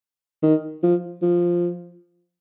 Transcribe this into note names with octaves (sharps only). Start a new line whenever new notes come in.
D#3
F3
F3